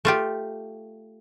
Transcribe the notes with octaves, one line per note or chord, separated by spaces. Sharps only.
A3 F4 G4